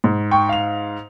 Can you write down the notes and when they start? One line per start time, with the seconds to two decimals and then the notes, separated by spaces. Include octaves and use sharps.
0.04 G#2
0.31 G5 C#6
0.49 F5 F7